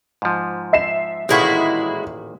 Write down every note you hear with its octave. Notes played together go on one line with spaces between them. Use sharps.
G#2 F3
E5 C7 E7
A1 A#2 D#3 G#3 E4 F#4